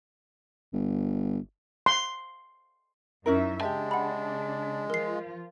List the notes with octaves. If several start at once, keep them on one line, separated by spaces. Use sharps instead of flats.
G1
C6
F#2 C#4 D#4 E4 A#4 E5
C#3 G#3 D4 G4 E5 A5
F#5 B5
F3 F4 A#4 C7